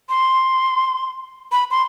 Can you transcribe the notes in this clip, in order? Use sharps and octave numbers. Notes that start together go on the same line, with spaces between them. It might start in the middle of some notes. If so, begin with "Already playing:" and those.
C6
B5
C6